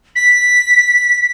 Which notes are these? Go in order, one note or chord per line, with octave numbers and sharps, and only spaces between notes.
B6